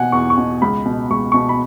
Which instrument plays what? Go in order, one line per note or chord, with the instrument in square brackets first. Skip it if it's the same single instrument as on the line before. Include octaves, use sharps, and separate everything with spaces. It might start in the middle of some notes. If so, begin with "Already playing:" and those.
Already playing: [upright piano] B2 F#5 G#5
E2 C#6
C#6
B2
C#2 B5
B2
C#2 C#6
B2 C#6
B5